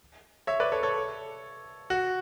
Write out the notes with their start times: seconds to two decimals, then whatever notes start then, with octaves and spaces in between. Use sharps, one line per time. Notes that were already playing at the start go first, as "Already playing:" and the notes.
0.47 C#5 E5
0.60 B4 D5
0.72 A4 C#5
0.83 A4 C#5
1.90 F#4